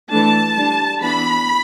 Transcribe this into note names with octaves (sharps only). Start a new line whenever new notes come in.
E3 A3 D4 A5
G3 D4
E3 B3 D4 B5